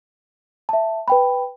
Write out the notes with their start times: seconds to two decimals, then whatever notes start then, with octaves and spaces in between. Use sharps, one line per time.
0.69 E5 A5
1.08 B4 G5 B5